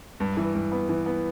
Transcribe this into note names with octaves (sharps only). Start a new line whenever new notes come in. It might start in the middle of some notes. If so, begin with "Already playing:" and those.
G2
E3
G2
B3
E3
B3